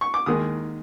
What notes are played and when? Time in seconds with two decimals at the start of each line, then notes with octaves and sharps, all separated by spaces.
0.01 C#6
0.14 D6
0.26 D#2 D#3 G#3 D#6